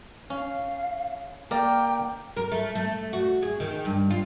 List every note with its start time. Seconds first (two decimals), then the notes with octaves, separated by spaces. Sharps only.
0.30 C#4 F5
1.51 A#3 A#4 D5 G5
2.37 A#4
2.52 A3
2.75 A3
3.13 F#4
3.42 G#4
3.60 D#3
3.85 G2
4.11 F4